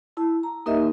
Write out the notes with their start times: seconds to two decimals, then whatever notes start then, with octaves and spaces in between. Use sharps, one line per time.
0.17 E4 A5
0.43 A#5
0.66 A#3 D#4 G4 A#4 D#5 E5